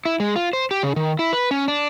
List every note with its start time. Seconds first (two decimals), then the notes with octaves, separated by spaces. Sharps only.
0.05 E4
0.20 G#3
0.36 F4
0.53 C5
0.71 G4
0.83 C#3
0.96 D#3
1.19 E4
1.33 B4
1.51 C#4
1.68 D4